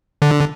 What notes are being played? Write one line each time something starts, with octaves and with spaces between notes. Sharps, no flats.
D3